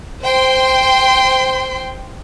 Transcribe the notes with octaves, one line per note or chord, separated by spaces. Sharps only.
C5 G5 C6